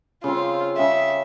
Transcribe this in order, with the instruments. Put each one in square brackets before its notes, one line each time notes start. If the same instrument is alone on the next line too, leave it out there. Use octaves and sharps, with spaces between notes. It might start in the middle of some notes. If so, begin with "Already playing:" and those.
[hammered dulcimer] C#3 C4 [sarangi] F4
[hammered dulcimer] C#3 G5 [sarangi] E5